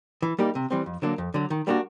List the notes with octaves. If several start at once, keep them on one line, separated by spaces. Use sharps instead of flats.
E3
G3 A#3 D#4 G4
C3
E3 G3 C4
F2
D3 F#3 A#3 D4
F2
D3 F#3
D#3
G3 A#3 D4 F#4